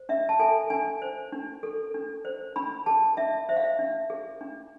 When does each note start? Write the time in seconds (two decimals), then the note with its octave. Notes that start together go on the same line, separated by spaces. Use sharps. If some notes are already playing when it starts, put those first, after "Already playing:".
Already playing: C5
0.09 D4 E5
0.29 A5
0.39 A4 G#5
0.70 D4 G#5
1.02 C5
1.32 D4
1.63 A4
1.94 D4
2.25 C5
2.56 D4 B5
2.86 G#4 A5
3.17 D4 E5
3.49 C5 E5
3.56 F5
3.64 E5
3.79 D4
4.10 G#4
4.41 D4